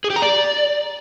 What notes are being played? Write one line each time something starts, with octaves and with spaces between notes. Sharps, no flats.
G#4
G4
A#5
D5